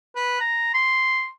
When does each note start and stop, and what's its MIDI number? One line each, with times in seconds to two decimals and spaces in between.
0.16 0.37 71
0.40 0.70 82
0.74 1.27 84